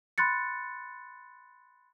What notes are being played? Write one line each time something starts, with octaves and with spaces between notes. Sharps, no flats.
B5 C6 F#6 A6 C#7